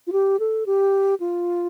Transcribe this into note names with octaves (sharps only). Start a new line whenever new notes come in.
F4
G4
A4
G4
F4